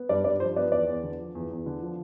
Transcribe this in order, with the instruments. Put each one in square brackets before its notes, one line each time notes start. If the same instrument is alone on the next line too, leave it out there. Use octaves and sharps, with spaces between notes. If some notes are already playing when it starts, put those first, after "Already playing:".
Already playing: [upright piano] B3
[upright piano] G2 [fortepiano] D5
[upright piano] G2 [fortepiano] D5
[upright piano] F3 [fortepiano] C5
[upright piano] B3 [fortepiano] D5
[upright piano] E2 [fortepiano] D5
[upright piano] E2
D3
F3
E2
E2
D3
F3